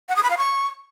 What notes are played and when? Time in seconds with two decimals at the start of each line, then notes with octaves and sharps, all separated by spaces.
0.09 F#5
0.16 D#6
0.23 B5
0.30 F5
0.38 C#6